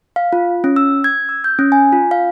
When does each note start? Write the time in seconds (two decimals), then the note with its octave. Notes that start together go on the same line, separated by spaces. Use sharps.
0.16 F5
0.33 F4
0.64 C#4
0.76 E6
1.04 G#6
1.29 E6
1.44 G6
1.59 C#4
1.72 G#5
1.92 F4
2.11 F5